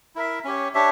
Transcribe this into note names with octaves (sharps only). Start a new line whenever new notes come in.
E4 A#4 E5
C#4 G4 C#5
D4 G4 C#5 E5